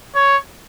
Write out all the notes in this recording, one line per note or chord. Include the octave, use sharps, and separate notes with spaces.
C#5